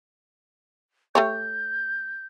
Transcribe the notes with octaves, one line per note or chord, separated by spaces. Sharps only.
A3 G4 C#5 G6